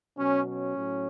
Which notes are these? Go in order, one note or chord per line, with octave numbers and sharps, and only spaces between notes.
B2 F#3 C#4
C#4
A2 F#3